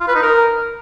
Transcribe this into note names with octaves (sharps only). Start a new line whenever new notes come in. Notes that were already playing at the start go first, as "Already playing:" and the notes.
F4
B4
D#4
A#4